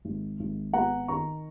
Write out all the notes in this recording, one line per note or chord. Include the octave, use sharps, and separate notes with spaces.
G#1
G#1
B3 F#5 A#5
D#3 A#5 C#6